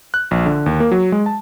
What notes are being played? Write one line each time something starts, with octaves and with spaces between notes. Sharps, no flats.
F#6
A#1
D3
D#2
A#3
F#3
G#3
A5